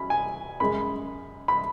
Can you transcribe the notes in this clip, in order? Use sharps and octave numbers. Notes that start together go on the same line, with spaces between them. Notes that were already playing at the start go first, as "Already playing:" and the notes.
Already playing: F#3 C#4 B5
G#5
F#2 C#3 G#3 B5
B5